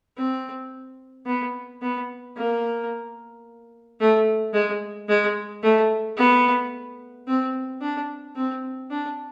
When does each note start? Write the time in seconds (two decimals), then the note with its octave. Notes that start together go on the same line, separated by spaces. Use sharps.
0.17 C4
1.27 B3
1.82 B3
2.36 A#3
4.00 A3
4.54 G#3
5.09 G#3
5.63 A3
6.17 B3
7.27 C4
7.82 D4
8.36 C4
8.91 D4